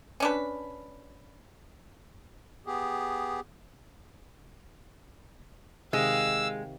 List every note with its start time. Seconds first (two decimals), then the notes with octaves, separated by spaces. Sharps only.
0.20 C#4 D4 B4
2.67 B3 G4 G#4
5.93 C3 D#3 G#3 F5 G5 E6